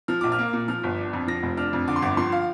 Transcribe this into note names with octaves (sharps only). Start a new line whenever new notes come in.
F3 F6
A#1 D6
F6
A#3
A#2
F3 F6
G1
D4
F2
F3 A#6
F1
D4 F6
F2
D3 D6
C6
G1 D6
F3 C6
F5